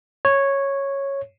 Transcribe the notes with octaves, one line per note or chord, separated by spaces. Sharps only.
C#5